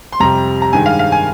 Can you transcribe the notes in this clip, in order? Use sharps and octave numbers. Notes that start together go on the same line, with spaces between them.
C6
F2 C3 G3 A#5
A#5
G2 D#3 G#3 G#5
F5
F5
G#5